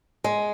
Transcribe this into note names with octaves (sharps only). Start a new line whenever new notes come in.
G#3